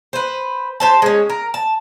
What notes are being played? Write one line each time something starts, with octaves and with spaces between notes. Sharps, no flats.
B4 C5
G4 C5 A5
G#3 C#4
A#4
A5